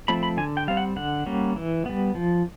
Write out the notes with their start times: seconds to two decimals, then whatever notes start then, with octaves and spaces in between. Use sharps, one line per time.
0.08 F3 A3 C4 B5
0.23 B5
0.37 D3 G#5
0.57 G5
0.68 G3 C4 F5
0.77 F#5
0.96 D3 F#5
1.26 G3 A#3 C#4
1.56 E3
1.86 G3 B3
2.15 F3